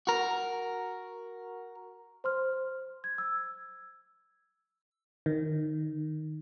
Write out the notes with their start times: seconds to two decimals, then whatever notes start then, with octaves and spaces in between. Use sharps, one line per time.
0.07 F#4 A#4
2.24 C5 C6 F6
3.04 G#6
3.18 E6
5.26 D#3